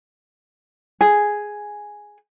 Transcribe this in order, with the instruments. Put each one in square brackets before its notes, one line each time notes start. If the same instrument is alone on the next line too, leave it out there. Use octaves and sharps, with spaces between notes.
[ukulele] G#4